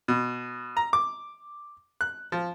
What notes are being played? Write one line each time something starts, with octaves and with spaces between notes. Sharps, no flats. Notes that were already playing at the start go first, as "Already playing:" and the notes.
B2
A#5
D6
F#6
F3